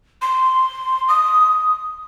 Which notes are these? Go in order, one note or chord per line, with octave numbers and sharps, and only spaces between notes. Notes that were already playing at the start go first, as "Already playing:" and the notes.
C6
D#6